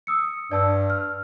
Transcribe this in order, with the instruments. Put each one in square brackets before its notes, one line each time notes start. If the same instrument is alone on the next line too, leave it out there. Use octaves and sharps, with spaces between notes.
[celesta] D#6 E6 C#7
[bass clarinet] G2 [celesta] D5 A5 E6
[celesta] F6